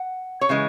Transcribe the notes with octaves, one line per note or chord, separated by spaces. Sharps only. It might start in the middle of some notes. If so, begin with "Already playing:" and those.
Already playing: F#5
C#5
C#3 E3 G#3